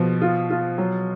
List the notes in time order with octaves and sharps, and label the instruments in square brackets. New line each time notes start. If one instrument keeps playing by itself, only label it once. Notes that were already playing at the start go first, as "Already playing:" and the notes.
Already playing: [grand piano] B2 [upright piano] F3
[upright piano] F4
F4
F#3